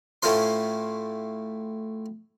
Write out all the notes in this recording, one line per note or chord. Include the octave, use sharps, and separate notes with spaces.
A2 A3 C#4 F4 C5 C6